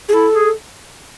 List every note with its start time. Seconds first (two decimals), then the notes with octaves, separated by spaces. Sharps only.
0.09 G#4
0.12 E4 A4
0.33 G#4